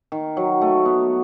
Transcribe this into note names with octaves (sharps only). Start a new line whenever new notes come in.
D#3
F#3
A3
B3